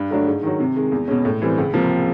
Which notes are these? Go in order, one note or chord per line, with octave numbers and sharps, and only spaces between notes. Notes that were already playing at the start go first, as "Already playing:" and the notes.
Already playing: G2
D3 F#3 A3 D4
G#2
D#3 F#3
C3
D#3 G#3
E2
B2 G#3 C#4
A2
E3 G3 C4
C#2
C3 F3 A#3